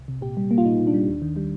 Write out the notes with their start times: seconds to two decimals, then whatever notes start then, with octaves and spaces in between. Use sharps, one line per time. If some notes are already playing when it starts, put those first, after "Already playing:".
Already playing: C2
0.08 C3
0.21 A#2 G4
0.37 G3
0.51 A#3
0.58 F4
0.65 A#2 D#4
0.80 A#2
0.87 D4
0.94 G3
1.08 D#2
1.22 D#3
1.36 G3